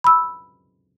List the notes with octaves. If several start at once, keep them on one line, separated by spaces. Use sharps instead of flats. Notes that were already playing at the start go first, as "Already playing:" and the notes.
B5 E6